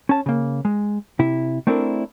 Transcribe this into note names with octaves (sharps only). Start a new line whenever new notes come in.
C#4 A5
C#3 A#3
G#3
C3 E4
A3 C4 D4 E4 A#4